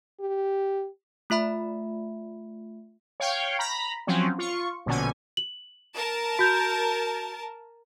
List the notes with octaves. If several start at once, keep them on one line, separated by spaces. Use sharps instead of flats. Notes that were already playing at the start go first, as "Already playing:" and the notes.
G4
A3 F4 E5 B5
C#5 F5 G5
A#5 B5
F3 F#3 C4 C#4
F4 C#6
A#1 B2 D3 C#4 G#5
F#7
A#4 A5
F#4 G6